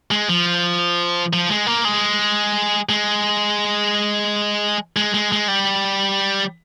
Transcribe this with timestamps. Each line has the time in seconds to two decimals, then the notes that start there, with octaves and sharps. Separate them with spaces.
0.11 G#3
0.29 F3
1.33 F3
1.49 G#3
1.67 A#3
1.85 G#3
2.89 G#3
4.97 G#3
5.14 G#3
5.32 G#3
5.48 G3